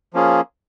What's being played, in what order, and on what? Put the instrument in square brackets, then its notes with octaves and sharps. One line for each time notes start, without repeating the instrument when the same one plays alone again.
[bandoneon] F3 A#3 C#4 F4 G#4